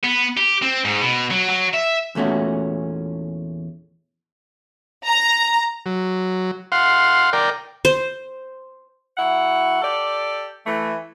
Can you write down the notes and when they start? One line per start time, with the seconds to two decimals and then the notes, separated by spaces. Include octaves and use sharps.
0.04 B3
0.37 G4
0.62 C4
0.85 G#2
1.01 B2
1.31 F#3
1.49 F#3
1.74 E5
2.15 E2 A#2 A3 C#4 F#4
5.06 A#5
5.86 F#3
6.72 F5 F#5 C6
7.33 A#4 D5 G5
7.85 C5
9.17 F#3 E4 F#5
9.81 G4 A4 D5
10.65 E3 A3